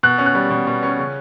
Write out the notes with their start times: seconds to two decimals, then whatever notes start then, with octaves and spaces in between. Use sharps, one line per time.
0.03 B2 F#6
0.18 C#4
0.26 F#6
0.35 G3
0.50 B2
0.67 B2
0.83 C#4
0.99 C#3